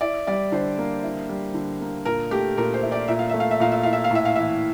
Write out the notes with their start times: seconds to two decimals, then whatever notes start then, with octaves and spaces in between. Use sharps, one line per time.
0.01 E4 D5
0.27 G3 D5
0.52 D3 C5
0.78 A#3
1.03 E4
1.29 G3
1.54 D3
1.81 A#3
2.05 A#2 A#4
2.31 A3 G4
2.57 A#2 A#4
2.74 C5
2.83 E4
2.92 D5
3.08 A#2 E5
3.19 F5
3.30 A3 E5
3.40 F5
3.51 E5
3.60 A#2 F5
3.72 E5
3.83 E4 F5
3.93 E5
4.04 F5
4.11 A2 E5
4.25 F5
4.36 E3 E5